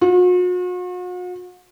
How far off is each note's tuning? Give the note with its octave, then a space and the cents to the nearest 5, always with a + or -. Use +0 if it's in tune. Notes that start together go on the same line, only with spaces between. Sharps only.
F#4 -45